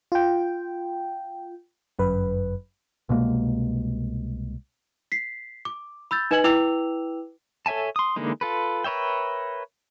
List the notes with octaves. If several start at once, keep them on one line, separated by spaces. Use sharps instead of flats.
F4 G5
G1 F#2 B4
C2 B2 G#3 A#3
B6 C7
D6
B5 E6 G6 A6
D#4 B4 D#5 G#5 G#6 F#7
E4 B4 G5 D6 E6 F7
A4 C#5 E5 G#5 A5
C6 D#6
D3 E3 G#3 A#3 D#4
F4 A4 B4
A#4 B4 C#5 E5 G5